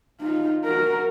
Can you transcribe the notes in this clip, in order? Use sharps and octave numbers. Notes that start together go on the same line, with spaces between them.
D#4 F4
F#4 A#4